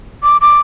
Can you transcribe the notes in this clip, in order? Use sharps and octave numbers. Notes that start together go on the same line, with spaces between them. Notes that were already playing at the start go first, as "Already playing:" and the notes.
D6
D6